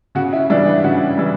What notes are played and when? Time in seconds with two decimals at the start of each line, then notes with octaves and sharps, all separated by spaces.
0.15 C#3 F#4
0.33 E4
0.50 E3 G3 D4
0.66 E4
0.84 C#3 F#4
1.17 E3 G3